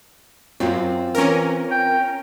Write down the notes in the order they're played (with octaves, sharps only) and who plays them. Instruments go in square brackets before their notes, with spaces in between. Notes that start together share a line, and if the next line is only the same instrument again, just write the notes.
[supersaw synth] F#2 [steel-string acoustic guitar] C4 F4
[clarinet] E3 [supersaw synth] C#4 A#4
[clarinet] G5